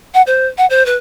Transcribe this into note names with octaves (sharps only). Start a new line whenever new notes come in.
F#5
C5
F#5
C5
B4